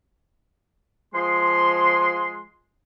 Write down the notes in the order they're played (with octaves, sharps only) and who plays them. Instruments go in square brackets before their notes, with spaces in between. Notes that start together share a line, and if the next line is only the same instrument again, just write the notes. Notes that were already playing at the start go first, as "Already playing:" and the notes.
[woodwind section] F3 G#3 C6